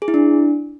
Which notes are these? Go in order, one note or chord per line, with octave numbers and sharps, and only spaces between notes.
G#4
E4
D4